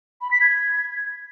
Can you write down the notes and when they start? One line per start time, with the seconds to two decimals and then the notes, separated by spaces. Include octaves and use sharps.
0.21 B5
0.31 B6
0.41 G#6